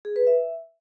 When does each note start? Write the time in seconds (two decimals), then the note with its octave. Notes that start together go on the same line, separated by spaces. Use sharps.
0.05 G#4
0.16 B4
0.27 E5